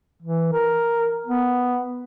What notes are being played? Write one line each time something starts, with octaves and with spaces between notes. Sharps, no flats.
E3
A#4
B3